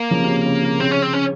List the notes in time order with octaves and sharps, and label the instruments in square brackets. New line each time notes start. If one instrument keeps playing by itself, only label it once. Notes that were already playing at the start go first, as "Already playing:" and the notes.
Already playing: [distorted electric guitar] A#3
[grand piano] C#3 F3
C3
C#3
C#3
C#3
[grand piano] C#3 [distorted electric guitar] C4
[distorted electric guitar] C#4
C4
C#4